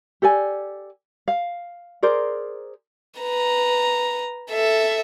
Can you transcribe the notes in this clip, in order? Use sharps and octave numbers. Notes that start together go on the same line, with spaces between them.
G4 A4 D5 G#5
F5
G#4 A#4 C5 D5
B4 A#5
A4 E5